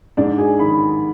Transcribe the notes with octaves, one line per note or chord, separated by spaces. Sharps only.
G#2 D4 D5
G#4 G#5
D#3 B5